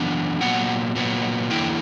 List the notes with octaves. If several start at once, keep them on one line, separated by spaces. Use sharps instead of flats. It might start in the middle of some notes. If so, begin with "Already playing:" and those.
Already playing: F#2 E3 B3 D4
A#2 F#3 B3 F#5
A#2 F#3 B3
E2 D3 A#3 E4 G5